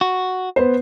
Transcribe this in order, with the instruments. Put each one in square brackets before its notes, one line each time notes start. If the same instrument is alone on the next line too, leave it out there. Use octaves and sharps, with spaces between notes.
[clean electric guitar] F#4
[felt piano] B3 B4 C5